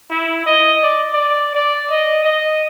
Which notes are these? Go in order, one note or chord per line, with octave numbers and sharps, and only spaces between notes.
E4
D#5
D5
D5
D5
D#5
D#5